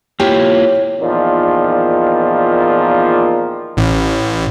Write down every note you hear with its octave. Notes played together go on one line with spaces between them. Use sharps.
A#3 E4 F4 G4 C#5
E2 A#2 D#3 F3
A1